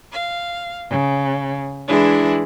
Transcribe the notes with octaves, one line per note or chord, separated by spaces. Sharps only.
F5
C#3
E3 G#3 D4 E4